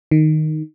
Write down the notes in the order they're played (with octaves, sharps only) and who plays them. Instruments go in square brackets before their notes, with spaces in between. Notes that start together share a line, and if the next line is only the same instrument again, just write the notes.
[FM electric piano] D#3